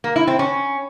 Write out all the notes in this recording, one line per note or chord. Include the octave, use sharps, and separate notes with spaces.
A#3
E4
C4
C#4